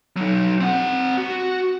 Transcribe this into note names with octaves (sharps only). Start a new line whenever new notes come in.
F#3 D#4
C4 F#5
F#4